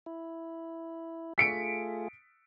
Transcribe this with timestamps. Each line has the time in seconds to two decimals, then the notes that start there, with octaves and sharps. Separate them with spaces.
0.06 E4
1.38 A3 F4 G#4 B6 C#7 D7